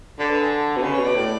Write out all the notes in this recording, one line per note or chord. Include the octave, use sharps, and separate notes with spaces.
D3 D5
B4
G#4
A4
B2
C#3 B4
B2 C#5
D5
A2